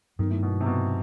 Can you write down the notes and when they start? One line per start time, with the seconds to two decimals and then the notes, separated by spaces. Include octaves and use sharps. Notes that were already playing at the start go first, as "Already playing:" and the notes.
0.19 G2 D#3 F#3 B3
0.30 A2
0.43 B2
0.61 C3
0.66 B2